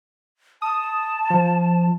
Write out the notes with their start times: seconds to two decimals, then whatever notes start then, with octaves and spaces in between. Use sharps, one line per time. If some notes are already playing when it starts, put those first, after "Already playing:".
0.62 A5 D#6
1.30 F3